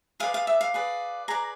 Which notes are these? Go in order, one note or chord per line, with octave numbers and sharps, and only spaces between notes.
G#4 B4 D5 F5
F5
E5
F5
G#4 B4 D5
G#4 B4 D5 A#5